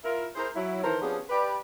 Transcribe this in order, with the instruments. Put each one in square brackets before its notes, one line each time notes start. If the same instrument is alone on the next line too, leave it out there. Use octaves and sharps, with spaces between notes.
[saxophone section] E4 F4 A#4
E4 G#4 A#4 C5
F#3 E4
D#3 E3 A4 A#4 C5
F3 B3 C#4 D4 G4 G#4
G4 B4 D5